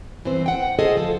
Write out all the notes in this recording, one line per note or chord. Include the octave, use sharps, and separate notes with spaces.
G2 E3 B3 C4 C5
F#5 G5
G#4 A4 C5 D#5
D2 F3 A4